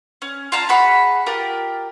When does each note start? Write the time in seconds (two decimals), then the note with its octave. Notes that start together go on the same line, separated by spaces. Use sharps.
0.22 C#4
0.52 F4 F5 A5 A#5
0.69 F#4 G#4 B5 C#6
1.26 F4 G4 A#4